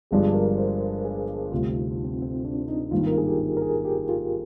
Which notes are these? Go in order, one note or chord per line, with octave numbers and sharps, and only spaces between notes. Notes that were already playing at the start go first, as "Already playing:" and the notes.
G1 G2 F3 G#3 D4 G#4
A#4
C5
G#4
D2 C3 G3 F4
D#4
C4
C4
D4
D#4
G#1 G2 D#3 A#3 F4
A#4
G#4
G4
A#4
G#4
G4
F4